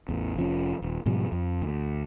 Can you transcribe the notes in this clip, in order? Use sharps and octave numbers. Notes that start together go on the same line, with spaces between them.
A1 E2
F1 F3 C#4
D#1
G#2 B2 F3 G3
F2
D2